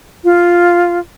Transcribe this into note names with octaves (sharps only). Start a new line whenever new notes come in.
F4